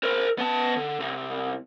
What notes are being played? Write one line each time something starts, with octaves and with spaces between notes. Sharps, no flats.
A#4 C5
B3 A5
D3
C2